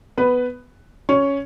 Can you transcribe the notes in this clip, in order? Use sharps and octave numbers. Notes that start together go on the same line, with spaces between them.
B3 B4
C#4 C#5